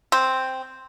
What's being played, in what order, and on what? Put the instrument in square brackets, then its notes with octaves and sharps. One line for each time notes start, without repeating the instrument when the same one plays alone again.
[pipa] C4